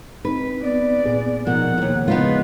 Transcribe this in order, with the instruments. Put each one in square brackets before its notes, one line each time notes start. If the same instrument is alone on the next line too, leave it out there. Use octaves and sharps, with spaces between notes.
[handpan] C4 D#4 [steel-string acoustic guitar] B4
[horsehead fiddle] B3 D5
[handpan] A#2 G#4
[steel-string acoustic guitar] B2 [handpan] F3 A#4 [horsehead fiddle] D#4 F#5
[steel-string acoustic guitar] D#2 G#2
[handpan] C#3 F3 G#3 [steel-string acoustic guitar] B3 D#4 F4 [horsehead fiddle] B4